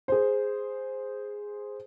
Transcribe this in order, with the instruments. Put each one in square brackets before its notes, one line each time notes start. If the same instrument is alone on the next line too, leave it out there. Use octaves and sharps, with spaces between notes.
[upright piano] G#4 C5